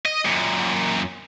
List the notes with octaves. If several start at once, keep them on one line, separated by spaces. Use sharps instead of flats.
D#5
F#2 A#2